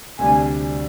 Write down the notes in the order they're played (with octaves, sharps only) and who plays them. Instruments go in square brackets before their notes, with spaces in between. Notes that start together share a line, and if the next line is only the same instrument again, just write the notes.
[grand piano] D2 C3 G3 D4 [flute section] G#5